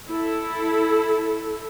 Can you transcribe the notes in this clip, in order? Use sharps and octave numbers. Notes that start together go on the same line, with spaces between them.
E4 A4